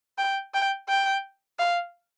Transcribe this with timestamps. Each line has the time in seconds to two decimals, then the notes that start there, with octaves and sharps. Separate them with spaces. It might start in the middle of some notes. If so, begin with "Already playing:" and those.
0.18 G5
0.54 G5
0.88 G5
1.59 F5